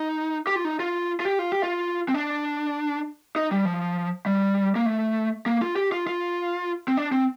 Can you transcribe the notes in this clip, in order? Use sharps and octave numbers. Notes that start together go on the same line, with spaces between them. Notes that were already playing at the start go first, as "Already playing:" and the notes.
Already playing: D#4
G4
F4
D#4
F4
F4
G4
F4
G4
F4
C4
D4
D#4
G3
F3
G3
A#3
A3
A#3
F4
G4
F4
F4
C4
D4
C4